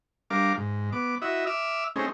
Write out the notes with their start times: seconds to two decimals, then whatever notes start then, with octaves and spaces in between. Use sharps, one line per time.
0.30 G3 D4 A#4 F5 D6
0.58 G#2
0.92 B3 D6
1.22 E4 F#4 D#5 E5
1.47 E5 D6 E6 F6
1.96 A3 C4 C#4 D#4 G#4